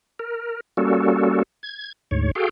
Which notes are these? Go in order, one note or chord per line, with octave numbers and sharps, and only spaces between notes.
A#4
G3 A#3 C#4 F#4 A4
G#6
D2 G#2 C#5
F#4 G#4 A4 F5 G5